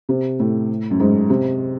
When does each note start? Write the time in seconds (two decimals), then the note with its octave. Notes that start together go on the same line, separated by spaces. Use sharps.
0.09 C3
0.40 A2
0.91 F#2
1.00 G#2
1.30 C3